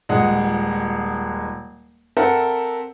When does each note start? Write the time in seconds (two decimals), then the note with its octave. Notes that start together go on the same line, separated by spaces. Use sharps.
0.09 D#1 G#3 F#5
2.17 C4 A4 A#4 E5 F#5